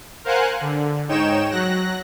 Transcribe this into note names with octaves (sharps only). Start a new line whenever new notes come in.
A#4 C5 F5 F#5 G#5 F#6
D3
G#2 D#4 C#5 G5 E7
F#3 F#6 A#6